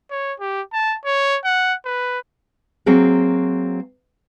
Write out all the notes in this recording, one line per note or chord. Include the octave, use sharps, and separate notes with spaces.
C#5
G4
A5
C#5
F#5
B4
F#3 A#3 C4 F#4 G#4